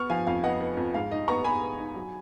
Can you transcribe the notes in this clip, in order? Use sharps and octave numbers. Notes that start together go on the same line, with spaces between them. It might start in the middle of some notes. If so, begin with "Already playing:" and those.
Already playing: B3 C#6 F6
F3 F5 G#5
F2 F5
B3 D#5 F#5
B3
F2
G#2 F5
D#4 D#5
B3 A#5 C#6
B3 G#5 B5
B3
D#4
F#3